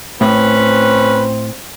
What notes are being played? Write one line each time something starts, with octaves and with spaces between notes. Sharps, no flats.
A2 C4 C#4 B4